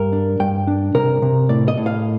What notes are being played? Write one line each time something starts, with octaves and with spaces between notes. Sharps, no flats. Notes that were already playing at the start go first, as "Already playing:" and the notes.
Already playing: G2 A#4
D4
G2 G5
D4
C3 A#4
C3
A2 D5
D#5
A2
F5